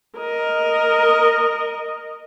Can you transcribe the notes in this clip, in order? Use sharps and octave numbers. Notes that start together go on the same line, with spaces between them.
A#4 D#5